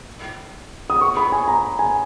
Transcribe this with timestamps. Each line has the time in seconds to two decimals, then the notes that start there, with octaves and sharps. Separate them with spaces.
0.90 D#6
1.01 C#6
1.17 B5
1.32 G#5
1.48 A#5
1.79 G#5